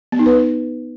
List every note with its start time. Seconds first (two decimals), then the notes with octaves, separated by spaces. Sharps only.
0.12 B3
0.19 D#4
0.26 B4